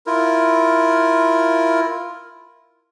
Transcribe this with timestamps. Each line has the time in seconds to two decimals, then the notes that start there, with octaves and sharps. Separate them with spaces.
0.07 E4 F4 A#4